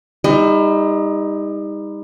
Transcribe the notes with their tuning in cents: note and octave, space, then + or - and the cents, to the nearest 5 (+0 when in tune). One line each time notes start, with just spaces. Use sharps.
G3 +40 D#4 +20